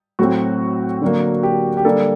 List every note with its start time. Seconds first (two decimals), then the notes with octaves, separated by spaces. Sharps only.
0.19 A2 F#3 A3 C4 F#4
1.02 D3 F#3 A#3
1.43 G4
1.77 G4
1.85 D3 G3 A#3 A4